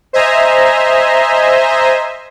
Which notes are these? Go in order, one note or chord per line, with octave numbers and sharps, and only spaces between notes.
C5 D#5 E5 G#5 A#5